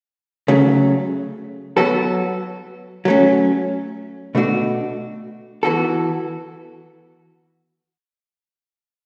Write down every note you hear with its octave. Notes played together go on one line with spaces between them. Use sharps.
C#3 F#3 A3
F#3 B3 F#4 A4
F#3 A3 C#4
B2 A3 D4 F#4
E3 B3 F#4 A4